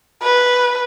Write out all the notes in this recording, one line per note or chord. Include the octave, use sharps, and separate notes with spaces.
B4